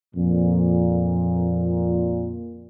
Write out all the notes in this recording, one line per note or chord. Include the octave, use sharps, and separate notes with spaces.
F2 A#2